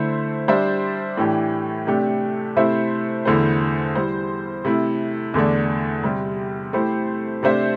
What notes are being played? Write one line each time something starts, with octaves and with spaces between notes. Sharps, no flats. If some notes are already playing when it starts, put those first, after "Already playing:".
Already playing: D3 A3 E4 C5 E5
G3 D4 C5 E5
A2 E3 A3 D4 G4
C3 A3 D4 G4
C3 A3 E4 C5 E5
E2 D3 A3 E4 C5
G3 E4 C5
C3 A3 E4
E2 D3 A3 D4
C3 G3 C4
A3 E4 G4 C5
C3 A3 D4 C5 E5